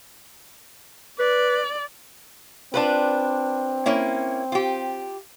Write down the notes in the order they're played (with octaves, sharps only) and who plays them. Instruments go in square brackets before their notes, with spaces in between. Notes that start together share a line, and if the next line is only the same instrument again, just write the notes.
[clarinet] B4 [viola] D5
[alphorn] C4 [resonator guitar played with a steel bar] D4 F4 B4
[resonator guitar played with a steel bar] A#3 C#4 E4
F4 G4